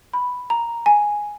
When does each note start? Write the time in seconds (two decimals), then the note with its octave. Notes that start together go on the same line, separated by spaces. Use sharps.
0.14 B5
0.50 A#5
0.86 G#5